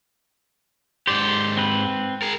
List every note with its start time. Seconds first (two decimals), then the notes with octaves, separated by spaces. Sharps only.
1.07 G#2 G4 C5 D5
1.57 C4 B4
2.22 G#4 A#4